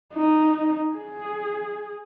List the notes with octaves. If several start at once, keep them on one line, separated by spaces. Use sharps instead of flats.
D#4
G#4